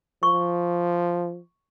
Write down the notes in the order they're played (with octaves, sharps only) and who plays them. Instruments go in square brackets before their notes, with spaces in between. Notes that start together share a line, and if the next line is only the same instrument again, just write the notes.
[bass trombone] F3 [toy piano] C#6